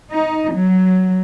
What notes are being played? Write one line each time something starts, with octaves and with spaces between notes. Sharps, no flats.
D#4
F#3